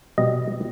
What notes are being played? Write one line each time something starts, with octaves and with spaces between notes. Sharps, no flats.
B2 G3 D#5